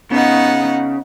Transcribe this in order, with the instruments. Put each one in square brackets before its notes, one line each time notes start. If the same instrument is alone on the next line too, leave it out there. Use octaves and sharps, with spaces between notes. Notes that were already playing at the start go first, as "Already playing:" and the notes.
[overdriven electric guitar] C#3 [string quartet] B3 D#4 F#5